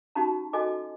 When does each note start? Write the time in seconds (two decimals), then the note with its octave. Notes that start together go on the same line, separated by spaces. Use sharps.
0.15 C#4 D#4 F#4 G4 A5 A#5
0.53 F#4 A4 D#5 G#5 D6